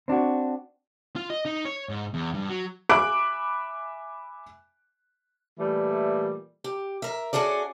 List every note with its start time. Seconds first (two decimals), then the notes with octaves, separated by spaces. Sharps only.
0.08 C4 D4 F4 F#4
1.16 F4
1.30 D#5
1.45 D#4
1.65 C#5
1.89 G#2
2.14 E2
2.34 G2
2.49 F#3
2.89 E5 G#5 B5 D6 F#6 D7
5.58 A#2 E3 G3 A3
6.64 G4
7.02 A#4 E5
7.33 C#4 F#4 G#4 A4 D5